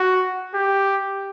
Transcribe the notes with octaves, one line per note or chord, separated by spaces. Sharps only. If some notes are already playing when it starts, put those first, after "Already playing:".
Already playing: F#4
G4